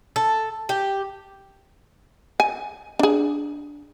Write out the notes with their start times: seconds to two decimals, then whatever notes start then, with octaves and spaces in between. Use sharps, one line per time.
0.16 A4
0.69 G4
2.40 G#5
2.99 D4 G#4